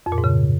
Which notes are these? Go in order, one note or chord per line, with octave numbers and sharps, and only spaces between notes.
F2
A#2
G#2
C#3